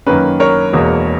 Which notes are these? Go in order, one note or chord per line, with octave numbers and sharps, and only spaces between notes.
F#2 D#3 A#3 C#4 B4
A#4 C#5
E1 E2 B2 A#3